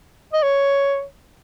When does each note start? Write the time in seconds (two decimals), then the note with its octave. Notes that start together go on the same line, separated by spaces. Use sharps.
0.33 D#5
0.43 C#5